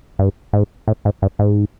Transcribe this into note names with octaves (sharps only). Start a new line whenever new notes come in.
G2
G#2
A2
G#2
G2
G#2